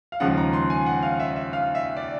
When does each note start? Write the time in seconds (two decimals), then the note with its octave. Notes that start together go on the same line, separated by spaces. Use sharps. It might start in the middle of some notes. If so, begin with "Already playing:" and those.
0.12 F5
0.20 D#2 C#3 F3 G#3 F#5
0.37 A#5
0.53 C6
0.70 G#5
0.86 F#5
1.03 F5
1.20 E5
1.36 E5
1.53 F5
1.75 E5
1.96 D5